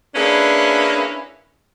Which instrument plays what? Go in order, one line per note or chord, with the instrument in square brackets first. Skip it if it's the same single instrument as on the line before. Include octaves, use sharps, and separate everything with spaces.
[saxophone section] A#3 C#4 D4 E4 G#4 B4